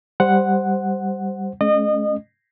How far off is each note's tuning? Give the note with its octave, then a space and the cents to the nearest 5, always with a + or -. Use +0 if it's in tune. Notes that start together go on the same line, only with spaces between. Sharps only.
G3 +0 C5 +0 F#5 +0
G#3 +45 C#4 +0 D#5 -30